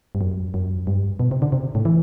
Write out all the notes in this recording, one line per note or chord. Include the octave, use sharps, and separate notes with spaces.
G2
F#2
F#2
G2
B2
C3
D3
C3
A2
E3